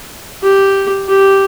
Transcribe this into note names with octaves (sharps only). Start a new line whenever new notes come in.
G4
G4